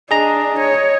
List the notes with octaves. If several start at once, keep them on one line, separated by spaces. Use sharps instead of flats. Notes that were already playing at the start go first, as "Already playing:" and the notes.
D4 G#4 D#5 A#5
C#5